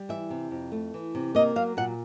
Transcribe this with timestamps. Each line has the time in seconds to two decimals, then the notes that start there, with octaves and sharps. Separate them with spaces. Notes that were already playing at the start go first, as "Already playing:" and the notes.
Already playing: G3
0.09 E3 E5
0.30 C3
0.51 F2
0.72 A3
0.94 E3
1.15 C3
1.35 A#3 D#5
1.56 F#3 F5
1.77 A#2 F#5